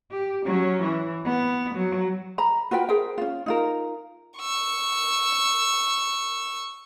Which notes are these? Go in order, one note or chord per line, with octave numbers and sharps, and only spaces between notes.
G4
F#3 C#4
E3
B3
F#3
A#5 B5
F4 F#4 B4 G5
G#4 A#4 C5 G5
C#4 F4
D#4 F4 A#4
C#6 E6